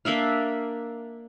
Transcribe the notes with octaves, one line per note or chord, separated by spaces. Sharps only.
A#3 D4 E5 F5